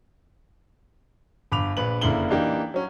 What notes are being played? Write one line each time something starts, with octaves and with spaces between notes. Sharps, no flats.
G1 B5 D6 F7
A#1 B4 F#7
F#1 D3 A#3 E4 F#7 G7
E3 A#3 D4 D#4 G4
F#3 C#4